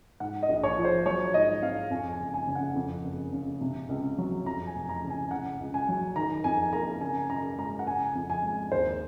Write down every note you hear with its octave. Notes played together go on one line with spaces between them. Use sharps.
G#2 F#5
D#5
A#1
C#5
F3
C5
F#3 C#5
G#2 D#5
C4 F5
F2 G#5
G#5
F#1
G#5
C#3
F#5
F2
F#1
C#3
C3
C#2
F#3
F2 A#5
G#5
F1
A#5
C#3
G#5
C#3 F#5
C#2
G#5
F#3
D#3 A#5
F2 G#5
A#3 A#5
C#3 G#5
F#2 A#5
G#3 A#5
F#5
C#3 G#5
F2
G#5
G#3
D#2 C5